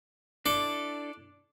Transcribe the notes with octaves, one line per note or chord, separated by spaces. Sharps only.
D4 E4 A4 D5